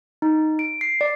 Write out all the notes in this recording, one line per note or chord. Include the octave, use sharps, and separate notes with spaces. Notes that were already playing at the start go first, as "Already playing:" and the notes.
D#4
D7
C7
D5